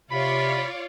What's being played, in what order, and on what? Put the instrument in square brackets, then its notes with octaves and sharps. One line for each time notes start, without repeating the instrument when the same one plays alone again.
[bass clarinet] C3 [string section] F4 C#5 D5 [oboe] B5